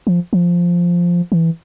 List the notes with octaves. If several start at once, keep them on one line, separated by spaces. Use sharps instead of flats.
F3
F3
E3